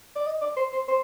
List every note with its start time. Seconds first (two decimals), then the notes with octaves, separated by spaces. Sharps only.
0.16 D5
0.26 D#5
0.41 D5
0.57 C5
0.72 C5
0.88 C5